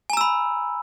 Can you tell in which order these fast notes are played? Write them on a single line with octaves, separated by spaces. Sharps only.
G#5 A#5 E6 B5